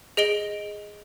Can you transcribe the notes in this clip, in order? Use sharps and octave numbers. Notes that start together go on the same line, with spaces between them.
G#4 D#5 D7 G7